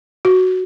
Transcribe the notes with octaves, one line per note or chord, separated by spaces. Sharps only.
F#4